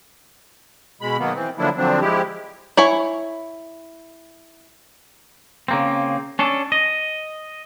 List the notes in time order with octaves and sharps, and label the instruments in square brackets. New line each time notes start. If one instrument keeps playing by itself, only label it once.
[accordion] B2 G#3 B5
B2 D#3 F#3 A#3 B3
E3 C4
D3 F3 F#3 A#3 D4 E4
D3 F3 F#3 C4 D4
F3 G#3 E4 G4
[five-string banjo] E4 C#5 G#5
[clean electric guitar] C#3 A#3 C4
C#4 D4 A4
D#5